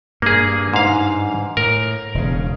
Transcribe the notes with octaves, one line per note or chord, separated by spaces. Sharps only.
G2 A#3 G#4
G#2 F5
A2 A#4
E1 C#3